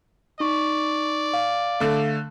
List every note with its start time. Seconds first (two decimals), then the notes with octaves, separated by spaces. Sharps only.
0.40 D#4 D5 C#6
1.34 F5
1.80 D3 A3